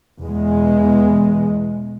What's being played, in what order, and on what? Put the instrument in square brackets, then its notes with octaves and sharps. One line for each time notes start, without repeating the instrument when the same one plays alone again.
[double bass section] E2 B2 G#3